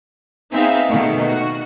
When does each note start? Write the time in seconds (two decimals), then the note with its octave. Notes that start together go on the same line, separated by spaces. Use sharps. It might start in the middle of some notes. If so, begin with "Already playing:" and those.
0.52 B3 C4 D#4 G#4 E5 F5
0.88 B2 D#3 A3
1.26 F#4